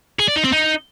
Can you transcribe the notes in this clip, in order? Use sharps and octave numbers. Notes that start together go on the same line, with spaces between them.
G#4
D5
D#4
C4
D#4